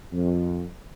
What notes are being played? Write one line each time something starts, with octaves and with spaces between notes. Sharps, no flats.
F2